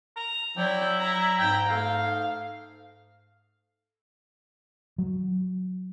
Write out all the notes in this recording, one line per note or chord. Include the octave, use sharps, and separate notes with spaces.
A#5
F#3 E4 D5 G5
A#5
G#2 G5 A#5
A3 F5
F#3